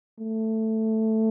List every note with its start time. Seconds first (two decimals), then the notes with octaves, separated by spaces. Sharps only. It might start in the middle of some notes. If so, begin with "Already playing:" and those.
0.19 A3